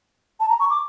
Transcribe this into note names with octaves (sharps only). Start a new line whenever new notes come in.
A5
A#5
C#6
D6